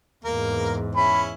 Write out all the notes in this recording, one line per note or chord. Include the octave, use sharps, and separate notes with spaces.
E2 G#2 A#3 A#4
C#4 E4 B5